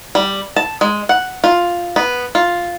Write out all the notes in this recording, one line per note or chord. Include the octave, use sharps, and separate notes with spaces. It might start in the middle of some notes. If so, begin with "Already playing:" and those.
G3
A5
G#3
F#5
F4
B3
F4